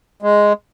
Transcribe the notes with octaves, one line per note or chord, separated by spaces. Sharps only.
G#3